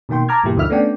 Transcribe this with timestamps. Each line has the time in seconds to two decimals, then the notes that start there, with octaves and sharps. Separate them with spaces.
0.09 B2 D#3 A#3 G5 C6
0.29 A5 A#5 D6 F6 G#6
0.44 G2 B2 E3 A#3 E4 G4
0.56 D2 D3 D#3 F3 E5 F6
0.70 A3 B3 C#4 D4 D5 G5